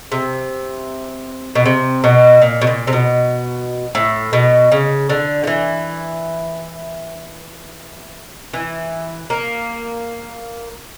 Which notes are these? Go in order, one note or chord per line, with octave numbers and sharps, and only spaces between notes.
C3
B2
C3
B2
A#2
B2
A#2
C3
B2
A2
B2
C#3
D3
F3
E3
E3
A#3